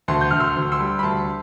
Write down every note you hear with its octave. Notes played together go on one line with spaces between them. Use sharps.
D2 A5 C6
G6
D2 F6
C6 E6
D2
C6 E6
G3
B5
D2 A5 C6